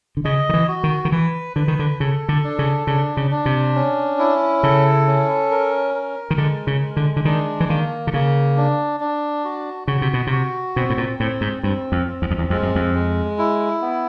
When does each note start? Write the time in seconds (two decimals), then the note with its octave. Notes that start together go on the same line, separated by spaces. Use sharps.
0.17 D3
0.25 C#3 D#5
0.49 D#3
0.54 E3
0.68 F#4
0.84 D#3
1.05 D#3
1.12 E3 B4
1.56 D3 B4
1.68 D#3
1.79 D3
2.00 C#3 A4
2.29 D3
2.44 D4
2.59 C#3
2.87 C#3 D4
3.17 C#3
3.31 D4
3.46 C3
3.75 C#4
4.19 E4
4.63 C#3 A4
5.07 C#4
5.51 A#4
5.95 A#4
6.30 D#3
6.38 D3 G#3
6.67 C#3
6.82 G#3
6.97 D3
7.16 D3
7.25 D#3 D4
7.60 E3
7.69 D#3 A#3
8.07 D3
8.13 C#3 A#3
8.57 D4
9.00 D4
9.44 F#4
9.88 C#3 F#4
10.02 C3
10.13 B2
10.27 C3 F#4
10.76 B2 C4
10.90 A2
10.98 A#2
11.19 A2 C4
11.41 G#2
11.63 G2 C4
11.92 F2
12.08 C4
12.22 E2
12.31 F2
12.38 E2
12.50 F2 G#3
12.63 F#2
12.75 F2
12.95 G#3
13.39 E4
13.82 B3